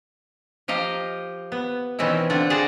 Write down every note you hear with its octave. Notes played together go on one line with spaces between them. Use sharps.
F3 G4 D#5 F5 A#5
B3
B2 D#3 E3 C4 C#4 E4
D3 C4 F4
G#4 C5 D5 F#5 A#5